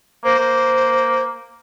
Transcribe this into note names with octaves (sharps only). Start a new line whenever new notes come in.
A#3 C5
A#3